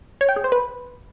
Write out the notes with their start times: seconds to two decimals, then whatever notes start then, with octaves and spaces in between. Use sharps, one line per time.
0.21 C#5
0.29 G5
0.36 G#4
0.44 C5
0.52 B4